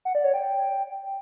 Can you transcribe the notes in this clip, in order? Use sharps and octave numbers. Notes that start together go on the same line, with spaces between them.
F#5
D5
C#5
G5